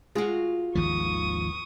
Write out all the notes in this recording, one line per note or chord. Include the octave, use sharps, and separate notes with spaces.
G#3 F4 F#4
G#1 D#2 F3 C#6 D#6